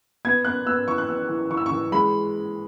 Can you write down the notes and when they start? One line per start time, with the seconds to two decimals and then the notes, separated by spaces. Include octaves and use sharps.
0.25 B3 G#6
0.45 B3 F#6
0.66 B3 E6
0.87 E3 C#6
0.98 F#6
1.08 B3 E6
1.29 E3
1.50 E3 C#6
1.57 E6
1.66 C#6
1.71 E3
1.92 G#3 B5